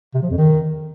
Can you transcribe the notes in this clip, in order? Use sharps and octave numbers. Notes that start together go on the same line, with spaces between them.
C3
F3
F2
D#3